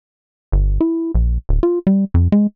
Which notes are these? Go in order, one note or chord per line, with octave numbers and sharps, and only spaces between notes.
G1
E4
A#1
D1
F4
G3
F2
G#3